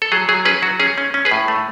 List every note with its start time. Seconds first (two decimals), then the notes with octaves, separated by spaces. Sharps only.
0.02 A4
0.12 F#3 G#4
0.29 F#3 G#4
0.45 C#4 G#4 B4
0.62 F#3 F#4
0.79 C#4 G#4
0.98 C#4
1.14 C#4
1.25 G#4 B4
1.31 A2
1.48 A3